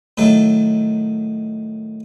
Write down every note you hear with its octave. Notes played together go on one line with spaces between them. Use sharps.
A2 D#3 F#3 A4